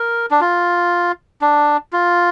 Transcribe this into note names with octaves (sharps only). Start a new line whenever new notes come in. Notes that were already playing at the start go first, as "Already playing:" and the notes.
Already playing: A#4
D4
F4
D4
F4